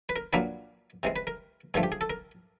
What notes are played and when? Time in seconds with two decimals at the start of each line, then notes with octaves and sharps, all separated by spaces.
0.09 B4
0.16 A#4
0.33 A#2 F#3 A#3 D4 B4
1.03 C3 E3 G#3
1.16 B4
1.27 A#4
1.74 G2 D3 F3 A3 G#4
1.83 G4
1.92 G#4
2.01 A4
2.10 A#4